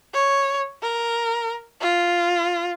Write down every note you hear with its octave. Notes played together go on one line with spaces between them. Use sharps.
C#5
A#4
F4